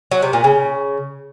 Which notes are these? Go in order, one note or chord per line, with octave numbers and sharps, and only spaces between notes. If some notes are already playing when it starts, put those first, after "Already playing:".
F#3
C3
A#2
C#3